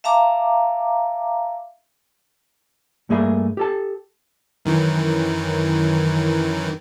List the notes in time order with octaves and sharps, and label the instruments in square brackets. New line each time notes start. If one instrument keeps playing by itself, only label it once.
[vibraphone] E5 F5 A5 A#5 D6
[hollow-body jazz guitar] G2 A3 A#3 G#4 E5 B5
G4 A4 A5
[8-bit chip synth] F#2 D#3 E3